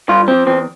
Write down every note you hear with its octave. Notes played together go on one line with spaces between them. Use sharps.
G2 F4
F3 C4
E2 C4